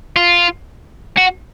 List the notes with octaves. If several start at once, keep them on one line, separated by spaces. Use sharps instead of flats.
F4
F#4